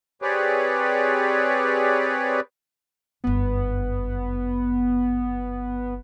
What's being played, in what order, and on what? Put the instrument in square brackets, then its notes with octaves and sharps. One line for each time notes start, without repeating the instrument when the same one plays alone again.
[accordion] C4 G4 G#4 B4 C#5 D5
[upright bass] G1 F#2 [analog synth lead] B3